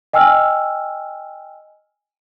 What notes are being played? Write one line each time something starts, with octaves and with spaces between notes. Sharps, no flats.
D#5 G5 G#5 E6 F6